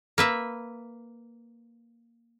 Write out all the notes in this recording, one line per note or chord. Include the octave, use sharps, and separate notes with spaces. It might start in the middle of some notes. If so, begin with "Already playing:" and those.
A#3 B4 E5